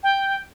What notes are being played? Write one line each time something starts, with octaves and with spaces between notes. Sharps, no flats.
G5